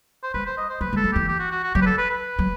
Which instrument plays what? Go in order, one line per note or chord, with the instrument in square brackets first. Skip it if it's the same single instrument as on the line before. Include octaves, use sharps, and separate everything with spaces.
[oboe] C5
[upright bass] G3 [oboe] B4
[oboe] C5
D#5
C5
[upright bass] F#3 [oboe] B4
[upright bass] G3
[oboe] A4
[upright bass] F#3
[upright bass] E3 [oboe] G4
[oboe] G4
F#4
F#4
F#4
[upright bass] F#3 [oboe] G4
[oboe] B4
A4
B4
B4
[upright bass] F#3